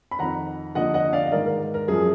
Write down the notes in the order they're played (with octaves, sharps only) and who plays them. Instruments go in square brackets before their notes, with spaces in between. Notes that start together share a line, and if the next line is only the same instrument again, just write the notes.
[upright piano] B5
F2 D#3 F#5 A#5
D#2 D3 F3 D#5 F#5
D#5 F#5
D5 F5
D#5
G#2 D#3 A#4 D5
A#4
A#4
F#2 F3 G#4